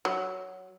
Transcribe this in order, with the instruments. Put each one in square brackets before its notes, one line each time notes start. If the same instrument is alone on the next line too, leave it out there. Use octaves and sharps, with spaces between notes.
[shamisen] F#3